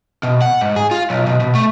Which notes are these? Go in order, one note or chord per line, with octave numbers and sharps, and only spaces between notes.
B2
F#5
G#2
G#4
F4
B1
B2
B2
A3